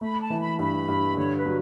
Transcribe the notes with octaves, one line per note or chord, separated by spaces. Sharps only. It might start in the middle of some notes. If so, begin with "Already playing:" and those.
A3 B5
A5
E3
B5
G2 B5
G2
D3 C#5
B4
F#3